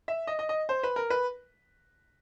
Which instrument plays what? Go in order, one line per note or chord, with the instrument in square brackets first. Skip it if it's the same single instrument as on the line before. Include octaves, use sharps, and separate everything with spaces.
[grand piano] E5
D#5
D#5
D#5
C5
B4
A#4
B4